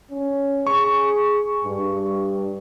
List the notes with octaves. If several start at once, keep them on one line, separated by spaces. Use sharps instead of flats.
C#4
G#4 C#6
G2